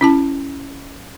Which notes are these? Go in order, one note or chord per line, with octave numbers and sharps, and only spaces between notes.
C#4 E4 A5